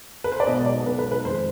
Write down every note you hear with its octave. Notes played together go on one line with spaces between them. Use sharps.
B4
C5
D5
B1 B2 G#3 D#5
D5
B1 B2 G#3 B4
B4
B4
F2 D#3 G#3 C5